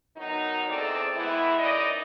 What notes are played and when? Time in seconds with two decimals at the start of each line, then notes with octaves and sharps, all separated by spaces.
0.17 D#3 F#3 B3 D#4
0.69 E2 C4 G#4 A4 D5
1.16 E3 G#3 B3 E4
1.59 F#2 D#4 D5 D#5